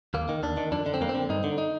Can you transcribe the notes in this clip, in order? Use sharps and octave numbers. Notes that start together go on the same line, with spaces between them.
D#2 A#3
D#3
D#2 D4
D#3
F2 D4
D3 D4
C4
F2 A#3
C4
D3
G2 D#4
D3
D#4